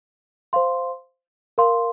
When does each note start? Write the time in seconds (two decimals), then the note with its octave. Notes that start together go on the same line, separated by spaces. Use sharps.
0.53 C5 F5 C6
1.58 A#4 F5 C6